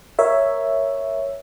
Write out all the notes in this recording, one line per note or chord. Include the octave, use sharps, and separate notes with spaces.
A#4 C#5 E5